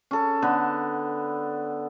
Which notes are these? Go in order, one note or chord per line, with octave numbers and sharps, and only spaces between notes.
C#4 A4
D3 B3